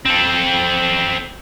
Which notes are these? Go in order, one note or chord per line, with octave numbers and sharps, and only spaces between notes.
C4 A4